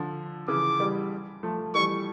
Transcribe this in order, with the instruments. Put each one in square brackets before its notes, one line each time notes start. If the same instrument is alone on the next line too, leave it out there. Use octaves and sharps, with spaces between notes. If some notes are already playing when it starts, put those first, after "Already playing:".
Already playing: [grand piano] D3 F3
[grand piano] C#3 E3 [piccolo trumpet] D6
[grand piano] E3 G3
F3 A3
[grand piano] E3 G3 [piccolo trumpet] C#6